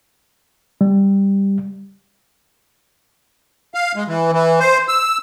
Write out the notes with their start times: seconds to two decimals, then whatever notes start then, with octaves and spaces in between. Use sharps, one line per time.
0.81 G3
3.74 F5
3.96 G#3
4.08 E3
4.32 E3
4.60 C5
4.88 E6